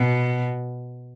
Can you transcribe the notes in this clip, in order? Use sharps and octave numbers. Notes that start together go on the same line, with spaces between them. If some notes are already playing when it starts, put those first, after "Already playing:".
Already playing: B2